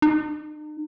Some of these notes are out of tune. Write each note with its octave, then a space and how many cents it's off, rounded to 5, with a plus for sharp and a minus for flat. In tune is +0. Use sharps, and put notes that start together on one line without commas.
D#4 -45